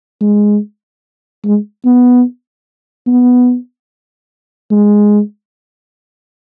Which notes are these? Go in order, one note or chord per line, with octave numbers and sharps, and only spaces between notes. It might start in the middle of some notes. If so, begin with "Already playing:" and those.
G#3
G#3
B3
B3
G#3